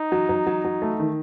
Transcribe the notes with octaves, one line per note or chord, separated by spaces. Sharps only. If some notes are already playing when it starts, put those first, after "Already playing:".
Already playing: D#4
F#3
F#3
F#3
F#3
A3
D#3